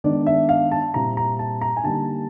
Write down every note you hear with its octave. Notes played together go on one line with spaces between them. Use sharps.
D#3 G#3 B3 D4 D5
E5
F5
A5
A#2 G3 C4 E4 A#5
A#5
A5
A#5
G#5
D3 G3 A#3 D#4 A5